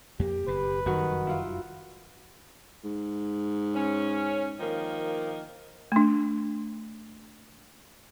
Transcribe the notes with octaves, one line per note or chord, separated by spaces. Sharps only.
F2 A#3 G4
F#1 B2 B4
F1 F#2 D#3 G3 F#4 F#5
E4 F4
G#2
C#4
D#3 F3 A#3
A3 D4